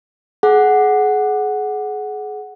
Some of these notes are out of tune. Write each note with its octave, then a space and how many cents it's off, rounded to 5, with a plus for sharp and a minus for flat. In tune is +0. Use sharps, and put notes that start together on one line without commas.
G#4 +30 F#5 +0